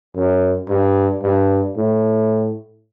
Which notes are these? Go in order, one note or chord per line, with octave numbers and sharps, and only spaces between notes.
F#2
G2
G2
A2